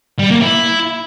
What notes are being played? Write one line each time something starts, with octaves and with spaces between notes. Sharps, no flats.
G3
A#3
E4